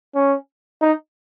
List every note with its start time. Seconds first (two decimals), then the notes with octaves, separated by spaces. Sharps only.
0.15 C#4
0.82 D#4